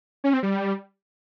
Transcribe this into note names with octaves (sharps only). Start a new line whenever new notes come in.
C#4
C4
G3